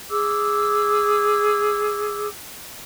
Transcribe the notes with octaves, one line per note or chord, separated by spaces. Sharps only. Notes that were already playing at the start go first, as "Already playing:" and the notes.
G#4 D6 E6